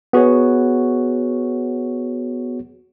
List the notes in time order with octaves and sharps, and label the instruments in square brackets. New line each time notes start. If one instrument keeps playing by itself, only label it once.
[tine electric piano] B3 F#4 G#4 C#5